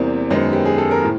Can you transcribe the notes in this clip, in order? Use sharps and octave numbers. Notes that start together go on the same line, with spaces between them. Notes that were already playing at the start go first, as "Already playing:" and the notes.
Already playing: E2 C3 E3 G3 A#3 C5
F#2 D#3 G#3 B3 C5
G4
G#4
A4
A#4
A2